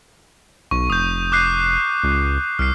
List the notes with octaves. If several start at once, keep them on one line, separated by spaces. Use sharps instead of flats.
B1 C#6
F1 D#6 G6
D6 F#6 C7
C#2
C2 F6 C7